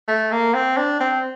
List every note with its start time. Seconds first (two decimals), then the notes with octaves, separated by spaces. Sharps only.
0.08 A3
0.32 A#3
0.54 C4
0.77 D4
1.00 C4